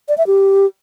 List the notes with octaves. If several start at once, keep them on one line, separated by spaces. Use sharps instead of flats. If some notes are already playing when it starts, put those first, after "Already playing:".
D5
E5
G4